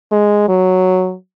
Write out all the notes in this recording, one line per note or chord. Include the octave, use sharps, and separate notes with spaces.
G#3
F#3